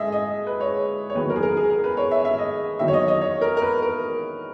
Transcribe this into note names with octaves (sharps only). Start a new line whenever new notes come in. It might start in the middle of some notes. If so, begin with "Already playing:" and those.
Already playing: G#2 G#4 D#5 E5
D#5
B4
C#5
C#5
E2 D#3 F#3 B4
A#4
G#4
A#4
G#4
A#4
B4
C#5
E5
E5
D#5
E2 D#3 F#3 E5
C#5
D#5
D#5
C#5
A#4
A#4
B4
A#4